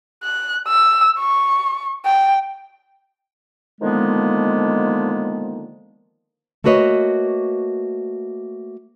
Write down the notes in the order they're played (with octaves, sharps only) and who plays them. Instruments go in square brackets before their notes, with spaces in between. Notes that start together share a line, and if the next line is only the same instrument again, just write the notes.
[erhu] F#6
E6
C#6
G5
[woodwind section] D3 D#3 F3 G#3 A#3 B3
[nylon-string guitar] A3 A#3 F#4 B4 C#5 D#5